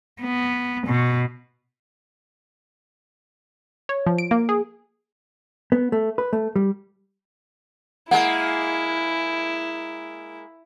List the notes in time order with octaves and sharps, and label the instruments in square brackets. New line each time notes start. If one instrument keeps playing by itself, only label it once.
[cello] B3
B2
[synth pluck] C#5
F3
D7
A#3
G#4
[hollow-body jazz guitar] B3
A3
B4
A3
G3
[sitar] G#3 A#3 [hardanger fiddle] E4 [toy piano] F#5